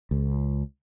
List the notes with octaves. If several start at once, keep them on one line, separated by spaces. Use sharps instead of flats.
C#2